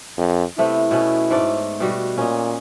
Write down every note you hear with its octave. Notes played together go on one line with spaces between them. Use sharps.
F2
C3 A3 B3 E4
B2 B3 C#4
G#2 A3 D5
B2 G3 F#4
A#2 C#4 D#5